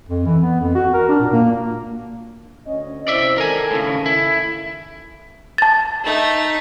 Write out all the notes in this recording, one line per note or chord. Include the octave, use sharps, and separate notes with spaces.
F2
E3
B3
F2
F#4
A#4
D4
A#2
A#3
D2 C#4 D#5
C3 E4 C5 D5 E5
D#3 A4 A#4 G#5
A2 C#3
E4
A5 A6
A3 D#4